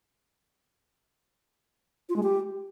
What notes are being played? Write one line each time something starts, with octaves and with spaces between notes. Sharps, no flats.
F4
G#3
G4